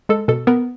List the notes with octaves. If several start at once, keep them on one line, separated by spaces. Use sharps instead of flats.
G#3 A4
B2 A4
B3 A#4